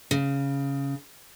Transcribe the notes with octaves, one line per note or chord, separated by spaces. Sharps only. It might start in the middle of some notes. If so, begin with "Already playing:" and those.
C#3